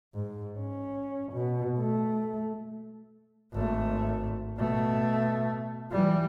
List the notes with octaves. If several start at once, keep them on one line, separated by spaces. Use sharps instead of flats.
G#2
C#4
B2
A3
G#1 A3
B2 A3
E3 G3